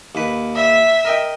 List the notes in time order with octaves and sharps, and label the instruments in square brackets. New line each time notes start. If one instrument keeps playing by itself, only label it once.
[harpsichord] D#2 B4
[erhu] E5
[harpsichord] A#4 D#5 G5